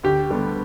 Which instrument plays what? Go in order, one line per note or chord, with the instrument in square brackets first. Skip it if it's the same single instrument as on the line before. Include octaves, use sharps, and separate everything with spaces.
[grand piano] D2 G4
D3 G3 B3